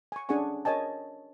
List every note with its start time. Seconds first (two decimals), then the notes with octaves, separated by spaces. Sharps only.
0.12 G#5 C#6
0.29 C#4 D4 G#4 F#5 G#5 C#6
0.65 A#4 C#5 D#5 G#5 A5